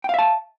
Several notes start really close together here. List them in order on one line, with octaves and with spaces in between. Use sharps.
G5 F5 E5 A5